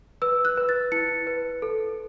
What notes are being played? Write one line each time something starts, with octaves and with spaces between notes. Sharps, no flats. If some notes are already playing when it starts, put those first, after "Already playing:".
B4 E6
F#6
B4
A6
E4 C#7
B4
A4